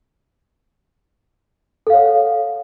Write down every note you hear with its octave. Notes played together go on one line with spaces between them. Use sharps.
A4 C#5 F5 F#5